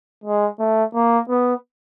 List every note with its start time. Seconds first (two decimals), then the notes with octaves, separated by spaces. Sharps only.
0.24 G#3
0.60 A3
0.95 A#3
1.29 B3